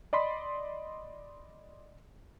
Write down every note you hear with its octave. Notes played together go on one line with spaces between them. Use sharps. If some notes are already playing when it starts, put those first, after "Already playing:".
D5 D#5 B5 C6 B6